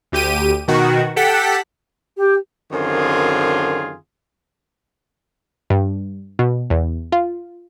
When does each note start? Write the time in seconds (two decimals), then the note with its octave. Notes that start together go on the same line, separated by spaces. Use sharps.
0.12 D2 G4 D#7
0.68 B2 D#3 F#4
1.16 G4 A4 F#5 B6
2.17 G4
2.72 F#2 D3 D#3 C4 F4 G#4
5.70 G2
6.39 B2
6.70 E2
7.12 F4